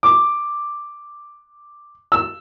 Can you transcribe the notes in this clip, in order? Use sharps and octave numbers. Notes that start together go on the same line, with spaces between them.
D6
E6